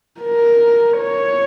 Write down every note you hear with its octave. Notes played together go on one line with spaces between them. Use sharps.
A#4
C#5